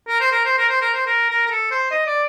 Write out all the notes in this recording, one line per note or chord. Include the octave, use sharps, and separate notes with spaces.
A#4
C5
A#4
C5
A#4
C5
A#4
C5
A#4
A#4
A#4
A4
C5
D#5
D5